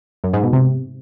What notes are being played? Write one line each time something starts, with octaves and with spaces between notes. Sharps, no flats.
F#2
G#2
B2
C3